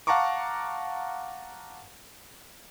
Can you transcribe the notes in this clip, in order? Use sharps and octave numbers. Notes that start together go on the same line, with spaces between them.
F5 F#5 A5 A#5 C#6 D6